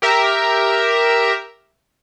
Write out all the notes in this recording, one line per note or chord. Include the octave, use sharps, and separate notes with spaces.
G4 A#4 E5